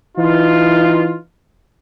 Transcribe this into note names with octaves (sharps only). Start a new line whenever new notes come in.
E3 D#4 F4